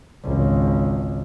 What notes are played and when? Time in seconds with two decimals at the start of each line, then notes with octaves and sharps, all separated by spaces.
0.24 G#1 C#2